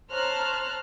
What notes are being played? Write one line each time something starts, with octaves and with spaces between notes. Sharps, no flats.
C5 C#5 A5 A#5 F6 F#6